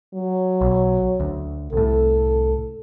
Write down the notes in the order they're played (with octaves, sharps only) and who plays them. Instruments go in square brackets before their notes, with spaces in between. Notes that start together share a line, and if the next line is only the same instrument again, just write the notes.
[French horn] F#3
[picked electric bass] B1
D2
[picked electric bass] C2 A2 [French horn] A4